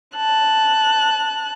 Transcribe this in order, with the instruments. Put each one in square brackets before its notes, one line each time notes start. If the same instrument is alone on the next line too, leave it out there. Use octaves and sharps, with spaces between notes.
[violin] A5 F#6